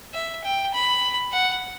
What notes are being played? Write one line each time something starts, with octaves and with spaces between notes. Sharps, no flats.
E5
G5
B5
F#5